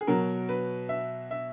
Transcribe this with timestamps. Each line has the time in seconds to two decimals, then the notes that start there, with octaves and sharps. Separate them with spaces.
0.01 G#4
0.07 B2 F#3 A#4
0.49 B4
0.89 E5
1.31 E5